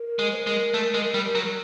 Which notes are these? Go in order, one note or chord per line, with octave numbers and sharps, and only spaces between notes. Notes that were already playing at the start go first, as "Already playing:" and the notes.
Already playing: A#4
G#3
C5
A#4
G#3
A3
G#3
G3
F#3